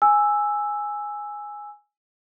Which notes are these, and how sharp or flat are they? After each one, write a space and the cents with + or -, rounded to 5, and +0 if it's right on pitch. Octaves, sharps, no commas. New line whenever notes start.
G#5 +0 E6 +0